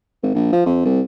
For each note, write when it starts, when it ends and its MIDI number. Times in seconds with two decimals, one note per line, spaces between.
0.23 0.33 32
0.35 0.51 34
0.52 0.63 53
0.66 0.85 41
0.85 1.01 36